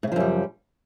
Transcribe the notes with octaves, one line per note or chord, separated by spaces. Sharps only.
F#2 A2 C#3 F3 G3